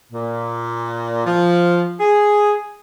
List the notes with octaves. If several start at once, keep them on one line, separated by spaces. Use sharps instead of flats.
A#2
F3
G#4